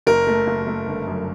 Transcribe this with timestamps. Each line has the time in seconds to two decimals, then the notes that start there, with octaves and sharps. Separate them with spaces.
0.07 F#1 A#4
0.27 A3
0.47 F#1
0.67 A3
0.87 G1
1.07 F#2